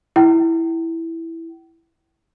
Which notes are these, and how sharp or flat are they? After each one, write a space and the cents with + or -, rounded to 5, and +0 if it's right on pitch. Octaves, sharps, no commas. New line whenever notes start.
E4 +0 G5 -40